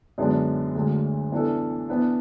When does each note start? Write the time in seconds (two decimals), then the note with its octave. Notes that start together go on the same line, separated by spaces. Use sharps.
0.18 F#2 D3 G#3 B3 D4
0.75 D2 D3 G#3
1.32 E3 B3 D4 A4
1.89 E3 B3 D4